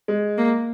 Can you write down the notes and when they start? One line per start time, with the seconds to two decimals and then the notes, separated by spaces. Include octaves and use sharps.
0.08 G#3
0.38 A#3